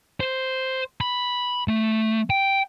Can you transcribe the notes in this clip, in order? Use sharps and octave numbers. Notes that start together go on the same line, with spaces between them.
C5
B5
A3
G5